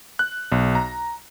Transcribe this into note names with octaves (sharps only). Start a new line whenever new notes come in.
F#6
B1
A#5